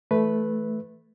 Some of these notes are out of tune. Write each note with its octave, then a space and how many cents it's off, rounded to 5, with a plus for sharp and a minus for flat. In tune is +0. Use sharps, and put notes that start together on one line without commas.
E3 +0 A3 -10 B4 +0